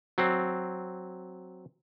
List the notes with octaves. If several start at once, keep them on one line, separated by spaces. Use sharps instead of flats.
F#3 C4